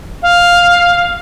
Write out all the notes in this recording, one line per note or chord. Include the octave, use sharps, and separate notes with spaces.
F5